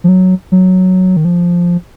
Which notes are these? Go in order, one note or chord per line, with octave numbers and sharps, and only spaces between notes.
F3
F#3
F#3
D#3
F3